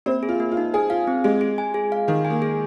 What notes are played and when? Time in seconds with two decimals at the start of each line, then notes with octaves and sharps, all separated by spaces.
0.06 A#3 C4
0.23 G#4
0.29 F4
0.40 A#3
0.51 F4
0.57 D#4
0.74 G#4 G#5
0.90 F4 F5
1.07 C4
1.24 G#3 G#4
1.41 G#4
1.58 G#5
1.74 G#4
1.92 F5
2.08 D#3 G#4
2.25 G#5
2.30 A#3
2.42 G#4